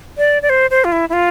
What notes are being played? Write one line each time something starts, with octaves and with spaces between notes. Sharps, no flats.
D5
D5
C5
C5
F4
E4
E4
F4